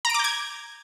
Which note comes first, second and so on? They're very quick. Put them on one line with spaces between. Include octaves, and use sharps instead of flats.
A#5 D7 D6 G6 G#6